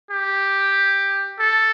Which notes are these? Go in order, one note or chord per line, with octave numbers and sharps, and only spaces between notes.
G4
A4